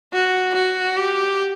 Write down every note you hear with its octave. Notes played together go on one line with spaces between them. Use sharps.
F#4
F#4
G4